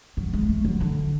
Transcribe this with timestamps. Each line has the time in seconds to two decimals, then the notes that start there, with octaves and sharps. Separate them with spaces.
0.17 F#3
0.33 G#3
0.49 A3
0.65 F#3
0.80 D3